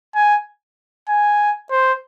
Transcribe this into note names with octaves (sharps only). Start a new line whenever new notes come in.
G#5
G#5
C5